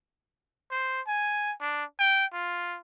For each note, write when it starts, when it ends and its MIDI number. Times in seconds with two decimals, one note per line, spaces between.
0.71 1.01 72
1.07 1.54 80
1.61 1.84 62
2.00 2.26 79
2.33 2.78 65